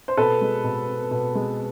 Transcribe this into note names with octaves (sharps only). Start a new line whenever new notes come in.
C5
B2 A4 B4
G#3
B2
B3
B2
G#3